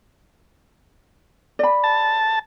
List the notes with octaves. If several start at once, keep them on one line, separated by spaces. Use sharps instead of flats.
D5 B5
A5